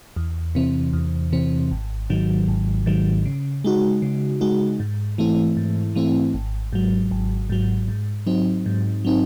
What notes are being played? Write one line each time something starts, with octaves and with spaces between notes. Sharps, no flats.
E2
C3 E3 C4
E2
C3 E3 C4
G#1
G#2 D#3 F#3
G#1
G#2 D#3 F#3
C#3
G#3 D#4 F#4
C#3
G#3 D#4 F#4
G#2
E3 A3 C4 E4
G#2
E3 A3 C4 E4
G#1
G#2 F#3
G#1
G#2 F#3
G#2
F#3 C4 D#4
G#2
F#3 C4 D#4